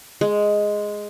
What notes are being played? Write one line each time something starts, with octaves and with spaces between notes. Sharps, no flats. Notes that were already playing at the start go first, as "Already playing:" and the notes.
G#3